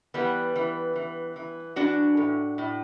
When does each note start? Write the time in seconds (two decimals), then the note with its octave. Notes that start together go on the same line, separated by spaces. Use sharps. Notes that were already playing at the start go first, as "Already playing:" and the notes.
0.14 E3 G3 B3
0.56 E3
0.96 E3
1.36 E3
1.76 E3 D4 F#4
2.17 A2
2.58 A2